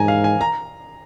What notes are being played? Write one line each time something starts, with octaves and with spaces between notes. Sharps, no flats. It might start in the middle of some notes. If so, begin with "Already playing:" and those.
Already playing: G#2 G#5 A#5
F5
G#5
A#5